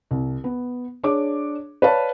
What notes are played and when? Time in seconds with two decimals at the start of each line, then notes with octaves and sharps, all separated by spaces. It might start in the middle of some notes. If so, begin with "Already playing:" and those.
0.11 C2
0.44 B3
1.04 D4 G#4 C#5 D6
1.82 B4 C#5 D5 F5 A5